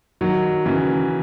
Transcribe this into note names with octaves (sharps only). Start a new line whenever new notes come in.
D#3 F#3
C#3 E3